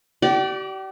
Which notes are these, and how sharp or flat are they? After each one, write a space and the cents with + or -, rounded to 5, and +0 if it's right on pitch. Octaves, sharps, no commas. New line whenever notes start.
G4 -40 D5 +0